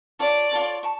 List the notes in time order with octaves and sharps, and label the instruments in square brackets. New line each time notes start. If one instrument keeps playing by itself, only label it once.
[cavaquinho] F4 A4 C#5 [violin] D5
[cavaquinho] F4 A4 C#5
A5 C#6